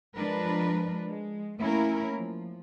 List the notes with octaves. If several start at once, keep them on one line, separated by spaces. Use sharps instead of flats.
F3 G#3 D4 A#4 B4
G#3
A3 A#3 C#4 E4 A#4
F3